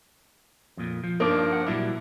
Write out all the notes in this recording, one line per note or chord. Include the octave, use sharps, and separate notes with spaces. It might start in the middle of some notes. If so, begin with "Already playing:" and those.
F2 A#2
F3
G2 F3 A#3 D#4 D5
F#5
A#2 F#3 G3 E4